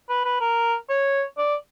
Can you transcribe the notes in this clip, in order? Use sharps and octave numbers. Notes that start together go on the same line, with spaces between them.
B4
B4
A#4
C#5
D5